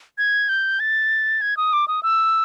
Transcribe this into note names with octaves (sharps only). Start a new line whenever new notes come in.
G#6
G6
A6
G#6
D#6
D6
D#6
E6